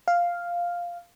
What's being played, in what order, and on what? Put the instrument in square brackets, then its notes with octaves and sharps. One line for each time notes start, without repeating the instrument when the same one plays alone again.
[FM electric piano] F5